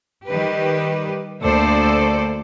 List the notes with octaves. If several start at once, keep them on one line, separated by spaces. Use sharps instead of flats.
D#3 G3 G4 B4
D2 A#3 A4 C5 D5